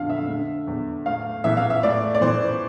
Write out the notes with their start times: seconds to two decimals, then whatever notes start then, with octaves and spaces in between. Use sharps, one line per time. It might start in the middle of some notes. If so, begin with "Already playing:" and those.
Already playing: F2 D3 F5
0.09 E5
0.28 D3
0.67 E2
1.06 A2 F5
1.44 E3 E5
1.57 F5
1.70 E5
1.83 A2 D5
2.15 D5
2.21 E3 C5